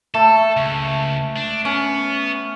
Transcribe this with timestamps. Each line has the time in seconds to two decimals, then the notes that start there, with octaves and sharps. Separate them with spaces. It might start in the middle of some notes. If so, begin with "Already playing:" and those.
0.14 A3 A4
0.57 C#2
1.36 D4
1.65 B3 C#4